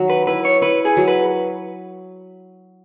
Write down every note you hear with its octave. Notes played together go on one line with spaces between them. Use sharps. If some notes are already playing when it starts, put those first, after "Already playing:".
Already playing: D#3 F#3
B4
E4 B4
C#5
E4 B4
G#4
F#3
B4